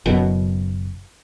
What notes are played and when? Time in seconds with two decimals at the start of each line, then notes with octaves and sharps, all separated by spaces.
0.06 F#1 F#2 B2